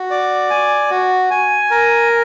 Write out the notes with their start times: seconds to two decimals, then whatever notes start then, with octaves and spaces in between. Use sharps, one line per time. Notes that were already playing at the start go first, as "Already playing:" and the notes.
Already playing: F#4
0.10 D5
0.50 G#5
0.90 F#4
1.31 G#5
1.71 A#4